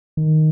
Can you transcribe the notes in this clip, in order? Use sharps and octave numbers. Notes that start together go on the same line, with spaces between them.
D#3